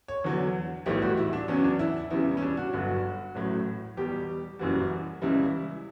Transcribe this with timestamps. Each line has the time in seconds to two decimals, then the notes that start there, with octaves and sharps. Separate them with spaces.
0.08 C#5
0.24 E2 D3 F#3
0.86 B1 A2 E3 G3 G4
1.02 F#4
1.17 E4
1.33 D4
1.48 E2 C#3 F#3 C#4
1.64 D4
1.79 E4
2.10 E2 C#3 G3 E4
2.37 C#4
2.42 D4
2.57 F#4
2.73 G1 G2 F#3 F#4
3.35 A1 A2 F#3
3.97 E2 B2 G3 G4
4.59 F#1 F#2 E3 G3 F#4
5.22 C#2 C#3 E3 G3 E4